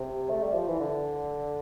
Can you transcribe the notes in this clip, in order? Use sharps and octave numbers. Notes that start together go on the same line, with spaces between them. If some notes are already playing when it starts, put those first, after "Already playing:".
Already playing: C3
A3
G3
F3
E3
D3